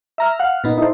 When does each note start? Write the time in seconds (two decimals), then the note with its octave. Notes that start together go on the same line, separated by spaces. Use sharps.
0.18 E5 A#5 F6
0.39 F5 F#5
0.64 A#2 B3 D#4
0.78 D#4 E4 A4 C5